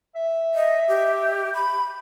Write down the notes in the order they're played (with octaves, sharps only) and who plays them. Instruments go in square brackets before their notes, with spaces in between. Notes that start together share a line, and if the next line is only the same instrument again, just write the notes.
[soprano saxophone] E5
[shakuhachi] D#5
G4
B5